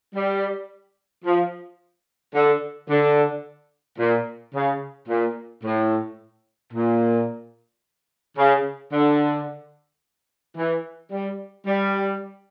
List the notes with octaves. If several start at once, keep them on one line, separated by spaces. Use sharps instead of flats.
G3
F3
D3
D3
A#2
C#3
A#2
A2
A#2
C#3
D3
E3
G3
G3